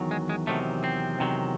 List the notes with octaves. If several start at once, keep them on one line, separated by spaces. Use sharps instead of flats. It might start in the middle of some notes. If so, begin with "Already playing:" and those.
Already playing: E2 D#3 F#3
G#3
G#3
E2 C3 D#3 F#3 A3
C4
E2 C3 D#3 F#3